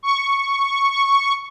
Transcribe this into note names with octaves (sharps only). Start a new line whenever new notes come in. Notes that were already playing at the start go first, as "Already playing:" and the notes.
C#6